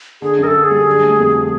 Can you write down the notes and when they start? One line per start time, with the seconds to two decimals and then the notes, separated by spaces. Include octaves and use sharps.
0.22 D3 G#4
0.39 F#2 A#4
0.47 A4
0.54 F#2
0.64 G#4
0.71 G3
0.87 D3
1.03 A3
1.19 F2
1.36 F3